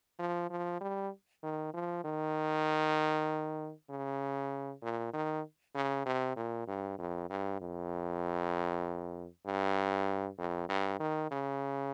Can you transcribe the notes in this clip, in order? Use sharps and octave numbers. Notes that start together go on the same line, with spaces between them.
F3
F3
G3
D#3
F3
D#3
C#3
A#2
D#3
C#3
C3
A#2
G2
F2
G2
F2
G2
F2
G2
D#3
C#3